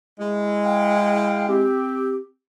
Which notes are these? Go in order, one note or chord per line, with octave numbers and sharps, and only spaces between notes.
G#3 E4
F5 G5
C4 G4